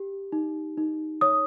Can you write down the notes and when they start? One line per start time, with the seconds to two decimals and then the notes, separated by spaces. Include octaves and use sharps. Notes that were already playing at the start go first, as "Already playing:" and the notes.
Already playing: G4
0.32 D#4
0.77 D#4
1.21 C#5 D#6